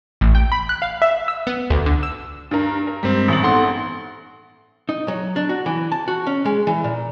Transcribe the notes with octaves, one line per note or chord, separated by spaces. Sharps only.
A1
G5
B5
F#6
F5
E5
E6
B3
D2
D3
E6
G2 A#4
A#4
G2 G3 G#3 C4 B6
A1 F#7
B3 D#4 A4 F#5 C6
D#4
F#3
D4
F#4
E3
A5
F#4
C#4
G#3
E3
A#2